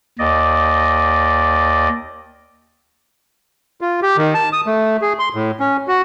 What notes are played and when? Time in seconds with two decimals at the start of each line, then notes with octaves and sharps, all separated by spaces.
0.19 D#2 D5 D#5
3.81 F4
4.02 G4
4.17 D#3
4.34 A5
4.53 D#6
4.67 A3
5.02 G#4
5.19 C6
5.35 A2
5.60 C#4
5.88 F#4